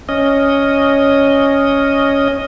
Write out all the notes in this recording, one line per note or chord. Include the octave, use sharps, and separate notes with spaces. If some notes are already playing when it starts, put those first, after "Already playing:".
C#4 D#5